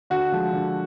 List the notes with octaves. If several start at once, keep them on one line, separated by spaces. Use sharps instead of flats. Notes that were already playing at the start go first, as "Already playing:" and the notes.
D3 F#4
F3 G#3
D3